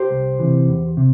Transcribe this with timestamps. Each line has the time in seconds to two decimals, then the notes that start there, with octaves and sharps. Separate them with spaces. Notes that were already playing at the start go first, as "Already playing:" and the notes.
Already playing: G4 C5
0.11 C2
0.39 C3 E3
0.68 E2
0.97 C3